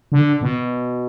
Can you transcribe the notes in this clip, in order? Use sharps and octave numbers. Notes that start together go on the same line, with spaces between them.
D3
B2